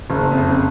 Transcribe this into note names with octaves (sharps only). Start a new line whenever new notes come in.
F#1
F2